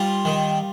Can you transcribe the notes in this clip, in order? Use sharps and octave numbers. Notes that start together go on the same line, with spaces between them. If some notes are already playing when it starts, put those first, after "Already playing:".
Already playing: G3 F4
D#3